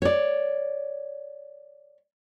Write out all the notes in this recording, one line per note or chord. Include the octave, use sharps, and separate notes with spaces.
C#5 D5